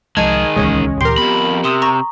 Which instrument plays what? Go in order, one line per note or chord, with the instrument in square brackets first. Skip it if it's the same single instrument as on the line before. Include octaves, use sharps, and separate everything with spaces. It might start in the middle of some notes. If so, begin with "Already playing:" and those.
[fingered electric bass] C2 F3 G#3 [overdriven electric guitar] D#3 G#4 [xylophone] D#5 A5 [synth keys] G#6
[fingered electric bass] D#1 C#2 E3 [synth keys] G#3 C#4
[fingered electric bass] D2 A#2 E3 [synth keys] G4 A#4 [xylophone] C6 C7
[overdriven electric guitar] F2 B5 [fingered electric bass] B3
[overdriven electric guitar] C3 [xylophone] C6 D#6 E6
[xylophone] A#5 C#6 A#6